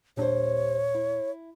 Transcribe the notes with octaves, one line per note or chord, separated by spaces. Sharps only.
D#1 A#2 G3 D4 C5 C#5
E4